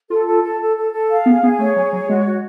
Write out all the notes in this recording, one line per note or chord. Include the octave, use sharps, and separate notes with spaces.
F4 A4
A4
A4
A4
A4
A4
F5
B3 G#4
B3 G#4
A3 C#5
F#3 G#4
F#3 C#5
G#3 F#4
F#4